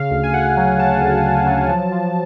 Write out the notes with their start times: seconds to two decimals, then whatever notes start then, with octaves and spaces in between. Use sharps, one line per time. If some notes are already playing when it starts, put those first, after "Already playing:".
Already playing: C#3 F5
0.11 D2
0.23 G#5
0.33 D2 F#5
0.57 F#3
0.79 C#3 A5
1.02 D2
1.23 D2
1.46 F#3
1.69 F3
1.92 F3